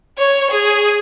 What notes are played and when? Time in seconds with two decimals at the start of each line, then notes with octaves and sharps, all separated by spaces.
0.18 C#5
0.51 G#4